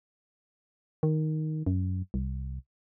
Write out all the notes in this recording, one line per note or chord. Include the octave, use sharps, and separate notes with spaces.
D#3
F#2
C2